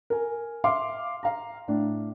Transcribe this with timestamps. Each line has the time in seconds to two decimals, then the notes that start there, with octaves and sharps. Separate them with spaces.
0.10 A#4 G#5
0.64 E5 F5 C6 D6
1.23 F5 A#5
1.68 A2 D4